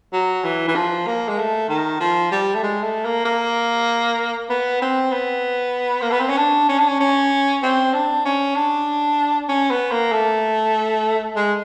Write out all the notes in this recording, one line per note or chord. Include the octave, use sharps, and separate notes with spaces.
F#3
E3
E3
F3
A#3
G#3
A3
D#3
F3
G3
A3
G#3
A3
A#3
A#3
B3
C4
B3
A#3
B3
C4
C#4
D4
C#4
D4
C#4
C#4
C4
D4
C#4
D4
C#4
B3
A#3
A3
G#3